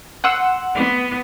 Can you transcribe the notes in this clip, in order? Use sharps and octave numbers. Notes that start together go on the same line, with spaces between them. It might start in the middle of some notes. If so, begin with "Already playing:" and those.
F#5 C6 E6
B3